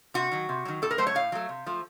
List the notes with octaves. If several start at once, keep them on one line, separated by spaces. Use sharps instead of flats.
C3 F#4
D#3 F#3
C3
D#3 F#3
A2 A4
A#4
F#3 A3 C5
C#5
A2 F5
F#3 A3
C3
F3 A3